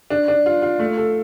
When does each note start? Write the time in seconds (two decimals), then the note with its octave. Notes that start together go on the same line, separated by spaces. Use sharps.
0.10 D4
0.28 D4
0.46 F4
0.62 F4
0.79 A3
0.97 A4